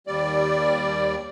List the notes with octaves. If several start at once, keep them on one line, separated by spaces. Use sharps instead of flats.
D#2 G3 D5